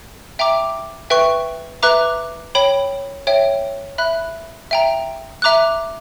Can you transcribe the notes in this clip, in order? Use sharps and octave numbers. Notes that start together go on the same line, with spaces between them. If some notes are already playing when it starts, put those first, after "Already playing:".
E5 G5 A#5 D6
B4 E5 G5 C#6
B4 E5 A#5 D6 F#6
C#5 G5 B5
C#5 E5 G5
E5 B5 F#6
E5 G5 A#5
E5 A#5 D6 F#6